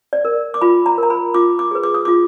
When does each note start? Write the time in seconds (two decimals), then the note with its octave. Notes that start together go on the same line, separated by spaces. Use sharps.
0.13 D5
0.25 A#4
0.54 D6
0.61 F4 B5
0.86 A#5
0.98 A#4 A#5
1.10 B5
1.34 F4 D6
1.59 D6
1.71 G#4 B4
1.83 D6
1.94 D#6
2.05 F4 D6